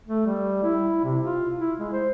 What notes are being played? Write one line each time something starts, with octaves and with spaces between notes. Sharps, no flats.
A3
G3
E4
C3
F4
E4
G#3
C5